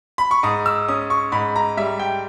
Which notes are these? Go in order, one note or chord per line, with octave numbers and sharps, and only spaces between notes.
B5
C#6
G#2 D#6
E6
C#4 D#6
C#6
G#2 B5
A#5
G3 E5
G5